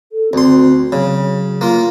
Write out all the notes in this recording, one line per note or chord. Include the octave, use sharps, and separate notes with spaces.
A4
D2 C4 C6
C#3 F#3
A#3 F4